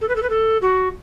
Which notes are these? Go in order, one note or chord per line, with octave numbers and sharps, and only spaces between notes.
A4
B4
A4
B4
A4
F#4